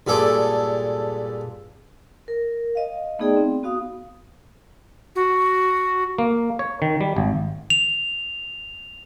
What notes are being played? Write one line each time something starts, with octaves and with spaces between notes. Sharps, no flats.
G2 A#2 G#3 A4 D6
A#4
D#5 F5
A3 B3 D#4 G#4 D5 G5
C4
B3 F#4 F5 D#6
F#4
A#3
C#5
D#3
G3
G#1
F7